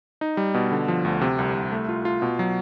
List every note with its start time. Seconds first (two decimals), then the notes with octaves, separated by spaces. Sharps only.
0.21 D#4
0.37 G3
0.54 B2
0.72 D3
0.88 F3
1.05 D2
1.21 C3
1.39 C2
1.55 C2
1.72 A3
1.89 F4
2.05 F4
2.22 B2
2.39 F#3